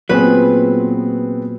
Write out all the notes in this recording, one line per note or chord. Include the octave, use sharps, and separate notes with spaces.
A#2 F#3 B3 C4 G#4 B4